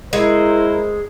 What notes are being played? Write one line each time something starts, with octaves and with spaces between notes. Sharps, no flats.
G#3 E4 A#4 C5